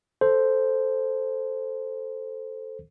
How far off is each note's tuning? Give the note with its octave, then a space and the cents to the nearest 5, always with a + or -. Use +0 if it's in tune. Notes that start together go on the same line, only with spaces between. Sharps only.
A4 +0 C5 +0